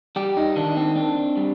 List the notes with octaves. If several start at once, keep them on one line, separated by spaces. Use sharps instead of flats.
G3 G4
D#4
D#3 D4
C4
C4 D4
G3